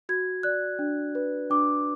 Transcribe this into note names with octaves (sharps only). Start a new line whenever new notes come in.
F#4 G#6
D5 F#6
D4
B4
D4 D6